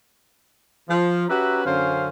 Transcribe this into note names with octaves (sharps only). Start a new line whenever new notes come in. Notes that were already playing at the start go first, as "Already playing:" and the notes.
F3
C#4 F#4 G4 B4 E5 A#5
F#2 D3 C#4 C5 F5